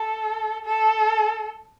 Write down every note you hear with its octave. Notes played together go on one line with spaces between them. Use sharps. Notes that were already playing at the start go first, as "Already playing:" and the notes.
Already playing: A4
A4